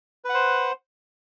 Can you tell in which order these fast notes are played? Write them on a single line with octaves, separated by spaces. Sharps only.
B4 F#5 C5